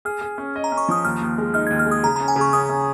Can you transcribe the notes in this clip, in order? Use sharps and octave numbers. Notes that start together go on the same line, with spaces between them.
G#4 F6
G#4
C#4
D#5
A#5
C#4
C#6
F3 D#6
D#2 F6
D#2
G#3
D#4 F6
G#6
D#2
F6
G#3 D#6
C#3 A#5
A#5
C#4
G#5
C#3
C#6
C#4 D#6
C#4